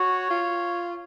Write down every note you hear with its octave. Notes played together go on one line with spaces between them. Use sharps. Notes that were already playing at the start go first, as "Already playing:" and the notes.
Already playing: F#4 C#5
F4